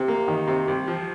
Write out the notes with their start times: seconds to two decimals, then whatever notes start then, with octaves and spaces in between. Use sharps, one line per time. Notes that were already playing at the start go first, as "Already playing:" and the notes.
Already playing: C3
0.08 A#3
0.28 D#3
0.48 C3
0.68 C2
0.88 F3